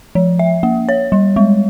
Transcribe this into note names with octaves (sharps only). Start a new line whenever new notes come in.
F3
E5
A#3
C#5
G3
G#3